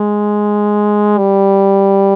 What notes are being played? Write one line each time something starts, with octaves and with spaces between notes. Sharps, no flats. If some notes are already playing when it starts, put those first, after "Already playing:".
Already playing: G#3
G3